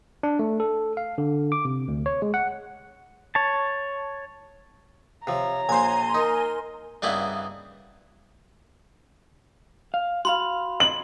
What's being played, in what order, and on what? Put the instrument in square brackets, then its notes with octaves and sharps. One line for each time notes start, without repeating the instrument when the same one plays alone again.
[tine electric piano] D4
A3
A4
F5
D3
D6
C3
D2
C#5
G#3
F#5
[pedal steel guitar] C#5 A5
[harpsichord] C3 F3 [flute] C#5 [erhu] A#5
[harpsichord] A#1 C5 [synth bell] G#5 C6
[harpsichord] D#4 [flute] A#4
[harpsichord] G2 C#3 A#3 B3 D#4 E4
[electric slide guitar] F5
[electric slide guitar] F#4 F5 [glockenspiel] B5 C6
[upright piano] F#7